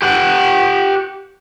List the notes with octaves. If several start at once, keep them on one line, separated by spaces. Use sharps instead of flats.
G4 F#5